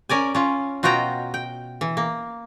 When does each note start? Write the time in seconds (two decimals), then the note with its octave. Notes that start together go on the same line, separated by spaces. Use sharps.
0.09 C#4 A#4 D5 G#5
0.35 C#4 F4
0.83 B2 F4 F#4 D#5 G5 A#5
1.34 G5
1.81 E3
1.97 A#3